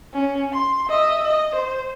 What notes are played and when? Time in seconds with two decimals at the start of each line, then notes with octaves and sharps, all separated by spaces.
0.14 C#4
0.53 C6
0.89 D#5 E5
1.25 D#5
1.56 C5